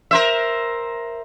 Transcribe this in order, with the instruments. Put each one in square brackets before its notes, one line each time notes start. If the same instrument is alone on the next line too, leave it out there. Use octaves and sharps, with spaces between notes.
[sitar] A#4 C5 E5